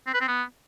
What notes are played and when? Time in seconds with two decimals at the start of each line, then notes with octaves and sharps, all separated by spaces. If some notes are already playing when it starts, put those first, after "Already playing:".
0.07 C4
0.14 B4
0.21 C4
0.28 B3